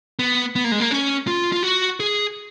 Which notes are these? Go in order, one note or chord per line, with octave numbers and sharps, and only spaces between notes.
B3
B3
A#3
G#3
A#3
C#4
F4
F4
F#4
G#4